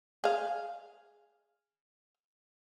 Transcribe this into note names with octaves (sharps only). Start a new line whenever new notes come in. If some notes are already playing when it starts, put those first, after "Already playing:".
G#4 F5